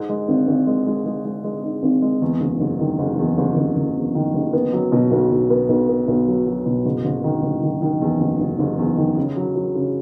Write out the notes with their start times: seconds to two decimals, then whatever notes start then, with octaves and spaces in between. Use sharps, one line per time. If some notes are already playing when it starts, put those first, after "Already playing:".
Already playing: G#2
0.09 G#3
0.28 G#1
0.47 G#1
0.67 G#3
0.87 G#3
1.06 G#3
1.25 G#3
1.44 G#3
1.64 G#2
1.83 G#1
2.02 G#3
2.22 E2
2.41 F#1
2.60 F#1
2.80 D#3
2.99 F#1
3.18 E2
3.37 F#1
3.57 F#1
3.77 F#1
3.96 E2
4.15 D#3
4.34 F#1
4.53 B3
4.73 F#3
4.92 B2
5.11 B1
5.31 B1
5.50 B3
5.69 B1
5.89 B3
6.08 B1
6.27 F#3
6.46 F#3
6.66 B2
6.85 F#1
7.05 F#1
7.24 D#3
7.43 F#1
7.62 D#3
7.82 D#3
8.01 E2
8.20 F#1
8.40 F#1
8.59 F#1
8.78 E2
8.97 D#3
9.17 C#3
9.36 F#3
9.56 F#3
9.75 C#3